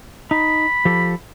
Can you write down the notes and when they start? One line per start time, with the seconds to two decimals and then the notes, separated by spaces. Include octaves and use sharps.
0.31 D#4 B5
0.85 F3 G4 A4